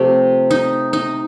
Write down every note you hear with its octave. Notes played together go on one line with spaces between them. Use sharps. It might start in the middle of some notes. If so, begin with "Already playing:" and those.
Already playing: C3 F3 A3 G4
D#4
D#4